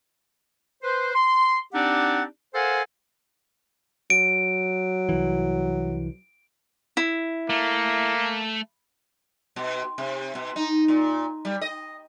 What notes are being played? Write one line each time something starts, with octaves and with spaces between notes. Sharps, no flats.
B4 C5
C6
C4 D4 D#4 G4 D5 F#5
A4 A#4 C5 F5 F#5 G#5
F#3 D7
C2 E3
E4
A3 A#3
B2
C3
B2
D#4
A#2
G3
D#5